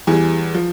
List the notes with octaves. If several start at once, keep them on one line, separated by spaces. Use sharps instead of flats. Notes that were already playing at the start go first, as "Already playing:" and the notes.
E2 E3 G3 G#4
F3